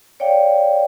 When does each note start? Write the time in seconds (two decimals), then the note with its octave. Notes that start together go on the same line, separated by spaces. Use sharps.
0.20 C#5 D5 F5 G5